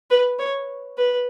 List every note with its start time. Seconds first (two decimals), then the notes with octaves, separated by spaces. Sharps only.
0.10 B4
0.39 C#5
0.98 B4